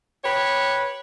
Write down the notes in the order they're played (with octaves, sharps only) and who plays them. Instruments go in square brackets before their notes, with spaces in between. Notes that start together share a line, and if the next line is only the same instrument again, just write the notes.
[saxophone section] G4 B4 C#5